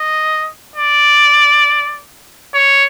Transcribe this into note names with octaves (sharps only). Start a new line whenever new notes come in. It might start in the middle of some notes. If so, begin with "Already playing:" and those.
Already playing: D#5
D5
C#5